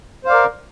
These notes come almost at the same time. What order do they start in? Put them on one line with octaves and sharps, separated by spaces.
C5 F5 D5 A#4